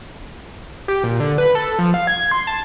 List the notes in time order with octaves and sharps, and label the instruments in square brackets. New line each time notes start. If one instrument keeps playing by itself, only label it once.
[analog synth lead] G4
A#2
D3
B4
A4
F3
F5
G#6
C6
A5